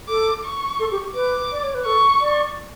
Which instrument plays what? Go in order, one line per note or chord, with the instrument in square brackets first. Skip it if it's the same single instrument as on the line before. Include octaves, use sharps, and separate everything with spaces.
[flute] A4 [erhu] D6
[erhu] C#6
[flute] A4
G4
[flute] B4 [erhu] D6
[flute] D5
C#5
B4
[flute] A4 [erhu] C#6
[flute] D5